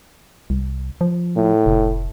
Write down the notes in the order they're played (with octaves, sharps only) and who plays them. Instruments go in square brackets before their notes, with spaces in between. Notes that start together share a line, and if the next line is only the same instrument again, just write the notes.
[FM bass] C2
F3
[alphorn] A2
[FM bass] F1